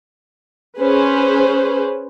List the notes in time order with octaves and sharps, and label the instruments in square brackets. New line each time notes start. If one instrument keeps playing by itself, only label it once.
[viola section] C#4 G#4 B4 C5